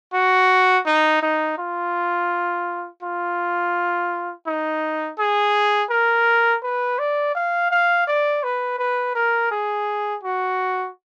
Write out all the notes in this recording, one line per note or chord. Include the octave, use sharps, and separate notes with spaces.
F#4
D#4
D#4
F4
F4
D#4
G#4
A#4
B4
D5
F5
F5
D5
B4
B4
A#4
G#4
F#4